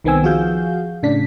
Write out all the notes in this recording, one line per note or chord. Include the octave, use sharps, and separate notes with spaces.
C2 D#3 B3 C4 G#5 E6
F3 F#4 G#4 F5 G6
A2 C#3 D4 B6